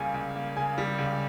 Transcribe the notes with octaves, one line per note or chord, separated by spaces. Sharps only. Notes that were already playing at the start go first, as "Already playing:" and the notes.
Already playing: C#2 C#3 G3 A#3 G#5
C#2
A#3
C#3 G#5
G3
C#2